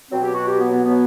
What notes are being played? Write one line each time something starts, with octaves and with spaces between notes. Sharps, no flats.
B2 F#3 C4
G4
F#4
G4
B3
B3
B3